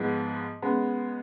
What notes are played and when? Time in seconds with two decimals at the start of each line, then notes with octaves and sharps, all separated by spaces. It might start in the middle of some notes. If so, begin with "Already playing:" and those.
Already playing: G#2 F3 G#3 B3
0.62 C#3 G#3 B3